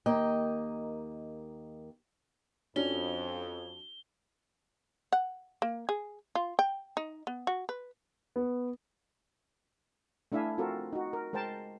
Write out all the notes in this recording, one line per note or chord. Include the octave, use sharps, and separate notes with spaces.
D#2 A#3 D#5 G5
F2 C#4 D4 F#4 G7
F#5
A#3
G#4
F4
G5
D#4
B3
F#4
B4
B3
A3 D4 E4 E5 F5 G#5
C4 F4 F#4 A4 A#4
D#4 F#4
A#4
G#3 A#4 C5 G5 A5